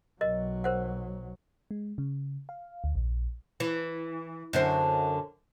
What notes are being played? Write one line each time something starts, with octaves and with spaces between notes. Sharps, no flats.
B1 F#3 A#4 D#5
A#4 C5 F#5
G#3
C#3
F5
D2
A#1
E3
F#2 D3 C5